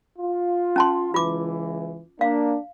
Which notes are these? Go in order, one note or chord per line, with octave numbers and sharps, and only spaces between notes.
F4
C#4 A5 C6
C#2 E3 F4 D6
A#3 D4 F5